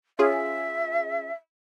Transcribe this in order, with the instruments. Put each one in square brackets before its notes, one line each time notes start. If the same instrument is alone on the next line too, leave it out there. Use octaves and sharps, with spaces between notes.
[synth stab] C#4 F4 G#4 [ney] E5